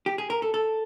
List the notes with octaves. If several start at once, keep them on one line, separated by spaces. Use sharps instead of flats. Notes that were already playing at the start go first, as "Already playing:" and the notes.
G4
G#4
A#4
A4
A4